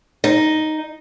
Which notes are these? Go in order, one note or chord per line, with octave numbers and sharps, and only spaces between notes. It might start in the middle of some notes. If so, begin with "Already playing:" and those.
D#4